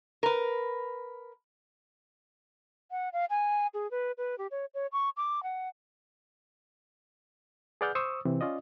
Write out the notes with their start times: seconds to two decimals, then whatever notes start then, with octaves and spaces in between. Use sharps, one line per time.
0.23 A#4 B4
2.91 F#5
3.13 F5
3.30 G#5
3.74 G#4
3.91 B4
4.18 B4
4.38 G4
4.51 C#5
4.74 C#5
4.92 C#6
5.17 D6
5.43 F#5
7.81 G#4 B4 D5 F#5 F6 G6
7.95 C5 C#6 D#6 E6
8.25 C3 E3 C4
8.41 C#4 F4 D5 D#5